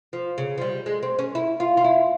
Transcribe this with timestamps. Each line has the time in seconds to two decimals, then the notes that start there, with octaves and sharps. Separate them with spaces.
0.13 F3
0.38 C#3
0.58 F3
0.62 G3
0.86 G#3
1.03 C4
1.19 C#4
1.35 E4
1.60 F4
1.77 F4
1.84 E4